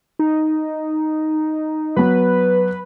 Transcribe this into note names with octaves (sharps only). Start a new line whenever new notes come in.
D#4
F#3 B3 B4